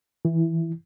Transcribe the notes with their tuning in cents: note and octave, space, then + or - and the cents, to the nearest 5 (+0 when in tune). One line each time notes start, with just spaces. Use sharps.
E3 -10 E4 +5